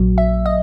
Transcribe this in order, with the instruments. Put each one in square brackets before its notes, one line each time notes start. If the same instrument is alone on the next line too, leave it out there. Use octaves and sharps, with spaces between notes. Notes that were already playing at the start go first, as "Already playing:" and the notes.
Already playing: [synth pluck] A#1 A#2 F#3
E5
D#5